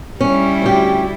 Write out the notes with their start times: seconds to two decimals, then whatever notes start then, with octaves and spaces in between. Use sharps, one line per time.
0.21 G3 C#4 E4
0.62 D2 C#4 G4